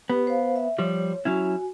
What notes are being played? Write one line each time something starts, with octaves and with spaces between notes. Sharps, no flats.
B3 G4 B4
C5 F5
E5
F3 G3 C#5
F#3 C#4 E4 F#4 G#5